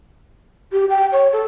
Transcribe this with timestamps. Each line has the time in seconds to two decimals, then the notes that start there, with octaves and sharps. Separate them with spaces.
0.72 G4
0.90 G5
1.12 C#5
1.33 A4